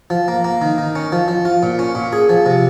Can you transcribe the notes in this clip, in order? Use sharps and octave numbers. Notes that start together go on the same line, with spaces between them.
F3
A#3
A#3
D#3
D#3
C#4
F3
F3
F4
A#2
C#4
A#2
G#4
F3
C3